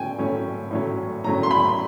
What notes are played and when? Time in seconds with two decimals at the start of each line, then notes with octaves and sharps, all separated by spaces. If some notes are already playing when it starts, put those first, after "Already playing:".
Already playing: A2 F#3 A3 C#4 G5 G#5
0.18 A2 F#3 A3 C#4
0.71 A2 F#3 A3 C#4
1.24 A2 F#3 A3 C#4 A#5
1.43 C6
1.51 B5